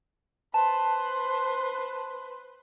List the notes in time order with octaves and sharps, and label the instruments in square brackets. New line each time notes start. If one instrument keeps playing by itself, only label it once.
[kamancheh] B4 C5 [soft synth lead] A5